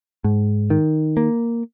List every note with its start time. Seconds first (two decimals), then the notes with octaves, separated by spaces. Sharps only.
0.24 G#2
0.70 D#3
1.17 A#3